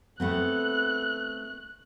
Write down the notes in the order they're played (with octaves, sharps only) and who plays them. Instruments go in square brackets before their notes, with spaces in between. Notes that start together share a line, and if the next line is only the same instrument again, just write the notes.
[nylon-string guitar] A3 B3 C4 [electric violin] F#6